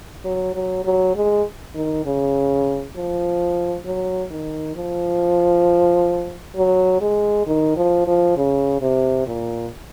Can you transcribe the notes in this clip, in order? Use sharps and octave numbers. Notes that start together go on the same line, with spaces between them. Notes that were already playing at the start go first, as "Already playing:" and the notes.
F#3
F#3
F#3
G#3
D#3
C#3
F3
F#3
D#3
F3
F#3
G#3
D#3
F3
F3
C#3
C3
A#2